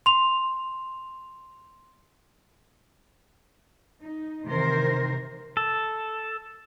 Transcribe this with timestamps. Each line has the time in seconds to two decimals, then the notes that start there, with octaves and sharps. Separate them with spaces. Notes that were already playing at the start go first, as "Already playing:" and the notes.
0.06 C6 F7
4.03 D#4
4.48 C3 D#3 E3 A#4 C5
5.57 A4